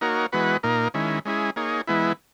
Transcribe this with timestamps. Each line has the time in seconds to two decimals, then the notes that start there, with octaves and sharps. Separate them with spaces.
0.01 A#3 D#4 F#4 A#4 C#5
0.32 E3 G#3 B3 F#4 B4
0.63 A#2 A#3 D#4 A#4
0.94 D#3 G#3 C#4 E4
1.25 G#3 C#4 E4 G#4
1.56 A#3 D#4 G#4 C#5
1.87 E3 G#3 B3 E4